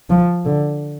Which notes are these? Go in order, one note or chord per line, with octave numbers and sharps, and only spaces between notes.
F3
D3